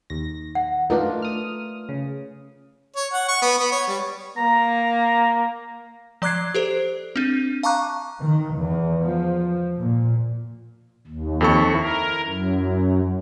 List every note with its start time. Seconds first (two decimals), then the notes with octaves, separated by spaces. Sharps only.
0.10 D#2 A#6
0.55 F#5
0.90 A3 D4 D#4 F4 A#4 B4
1.22 D#6 F6
1.89 C#3
2.96 C#5
3.13 F#5
3.28 C#6
3.42 B3
3.58 B3
3.72 C#5
3.87 G3
4.37 A#3 A#5
6.22 F3 D5 D6 F#6 G#6 C7
6.54 G4 A4 C5
7.16 C4 D4 D#7
7.63 F5 A5 A#5 C#6 D6 F#6
8.21 D#3
8.58 E2
9.01 F3
9.78 A#2
11.07 D#2
11.41 F2 A4 C#6
11.74 E4 A#4
12.23 F#2